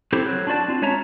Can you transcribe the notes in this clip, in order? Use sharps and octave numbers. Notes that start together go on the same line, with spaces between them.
C4 E4 G4 A4 C5
F#3
D4 F4 F#4 D5 A5
C4 F4
G#3 C#4 C#5 E5 A5 A#5